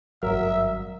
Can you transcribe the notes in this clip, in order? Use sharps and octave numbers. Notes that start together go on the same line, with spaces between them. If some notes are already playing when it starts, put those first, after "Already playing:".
G#1 G2 F#3 A#4 E5